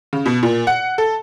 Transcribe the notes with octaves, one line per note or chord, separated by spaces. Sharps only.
C#3
B2
A#2
F#5
A4